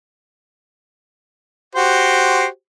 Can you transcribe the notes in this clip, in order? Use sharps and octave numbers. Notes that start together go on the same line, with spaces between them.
F#4 G4 C5